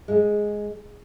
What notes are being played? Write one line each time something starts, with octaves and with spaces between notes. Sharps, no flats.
G#3